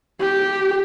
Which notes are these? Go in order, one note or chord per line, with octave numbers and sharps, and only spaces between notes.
G4